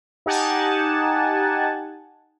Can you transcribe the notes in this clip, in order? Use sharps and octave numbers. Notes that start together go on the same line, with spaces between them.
D#4 G4 F#5 G#5 A5